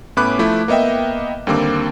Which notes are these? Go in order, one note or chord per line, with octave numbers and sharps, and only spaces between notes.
A2 B3 C#4 B5 D6 F#6
F3 A3 E4
A#3 B3 D#5 E5 G5
D#2 D3 G3 A#3 C4 D6